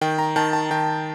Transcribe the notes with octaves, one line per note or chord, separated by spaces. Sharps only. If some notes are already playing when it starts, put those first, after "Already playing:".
D#3 G5
A#5
D#3 A5
A5
D#3 G5